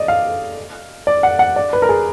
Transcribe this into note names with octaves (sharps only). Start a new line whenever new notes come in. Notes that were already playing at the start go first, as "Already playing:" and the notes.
Already playing: D5 D#5
F5
D5
F#5
F#5
D5
B4
A#4
G#4